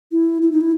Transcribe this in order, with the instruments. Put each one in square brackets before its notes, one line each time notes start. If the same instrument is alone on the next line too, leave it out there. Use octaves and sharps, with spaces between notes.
[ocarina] E4
E4
D#4
E4